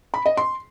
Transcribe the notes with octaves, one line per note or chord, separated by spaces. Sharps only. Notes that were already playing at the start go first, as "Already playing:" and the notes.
B5
D#5
C6